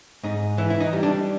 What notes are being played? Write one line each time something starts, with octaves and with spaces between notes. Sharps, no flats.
G#2 D#4
E3 E4
E4
D#4
G3
D4